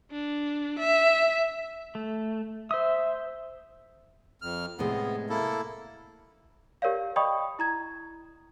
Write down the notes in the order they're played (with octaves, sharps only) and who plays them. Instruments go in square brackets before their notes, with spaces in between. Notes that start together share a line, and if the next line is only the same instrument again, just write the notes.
[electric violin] D4
E5
[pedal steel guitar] A3
[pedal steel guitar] C5 D#6 [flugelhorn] E5
[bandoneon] F2 F6
[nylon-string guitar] A2 C3 G#3 [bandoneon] B3
[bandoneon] A#3 E4 A4
[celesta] G4 A#4 C#5 D5 F5
D5 D#5 G5 B5 C#6 D#6
E4 A#5 G#6